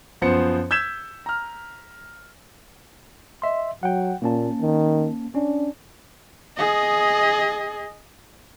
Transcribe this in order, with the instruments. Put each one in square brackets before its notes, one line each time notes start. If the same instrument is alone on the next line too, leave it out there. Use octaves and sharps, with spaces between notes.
[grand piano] F#2 F3 B3 C5 C#7
E6 G6 G#6 B6 E7
A#5 F6
[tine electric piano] D#5 E5 C6
[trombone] F#3 [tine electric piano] F#5 G5
[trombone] A#2 [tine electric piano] A#3 C#4 A5
[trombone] D#3
[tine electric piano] C#4 [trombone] D4
[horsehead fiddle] G#4 D#5